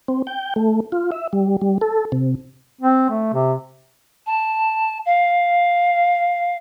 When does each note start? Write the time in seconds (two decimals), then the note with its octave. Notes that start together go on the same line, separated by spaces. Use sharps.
0.08 C4
0.27 G5
0.56 A3
0.92 F4
1.12 E5
1.33 G3
1.61 G3
1.81 A4
2.12 C3
2.81 C4
3.10 A3
3.34 C3
4.26 A5
5.05 F5